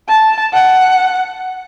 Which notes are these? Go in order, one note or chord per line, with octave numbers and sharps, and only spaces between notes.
A5
F#5